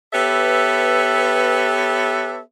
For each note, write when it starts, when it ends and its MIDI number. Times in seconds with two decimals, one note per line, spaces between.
0.13 2.39 59
0.13 2.39 67
0.13 2.39 69
0.13 2.39 71
0.13 2.39 73
0.13 2.39 76